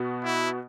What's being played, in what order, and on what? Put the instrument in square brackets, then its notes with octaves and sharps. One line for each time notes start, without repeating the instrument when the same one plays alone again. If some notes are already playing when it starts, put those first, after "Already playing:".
Already playing: [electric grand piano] B2 B3 F#4
[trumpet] E4